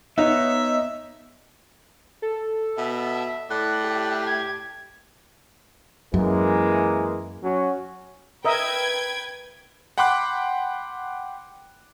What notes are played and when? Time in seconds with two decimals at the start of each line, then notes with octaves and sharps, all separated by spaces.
0.18 B3 D#4 C#5 E5
2.22 A4
2.78 B2 E5
3.50 A2 D5 F#6
3.84 G4
4.27 G#6
6.14 F#2 E3 G#3 A#3
7.43 F#3 C#4 F#4
8.45 A#4 B4 D#5 E5 G5 G#6
9.98 F#5 G5 B5 C6 D6 F#6